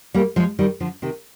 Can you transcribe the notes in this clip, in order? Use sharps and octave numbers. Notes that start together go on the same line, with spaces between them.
G3 A#3
F3 G#3
D#3 G3
D3 F3
C3 D#3